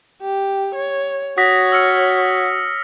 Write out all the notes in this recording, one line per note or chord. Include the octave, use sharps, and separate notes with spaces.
G4
C#5
F#4 C#5 D#6 A#6 B6
E6 F6 C#7